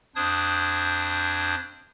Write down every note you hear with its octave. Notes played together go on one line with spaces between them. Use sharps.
F2 D4 C5 D#6 G#6